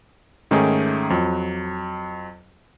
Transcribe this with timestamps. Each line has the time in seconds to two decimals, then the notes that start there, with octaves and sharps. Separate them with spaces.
0.51 G#2 D#3 A3 C#4 D#4 G#4
1.10 F2 F#3